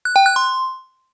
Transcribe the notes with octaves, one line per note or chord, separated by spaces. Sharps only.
F#6
G5
F#6
C6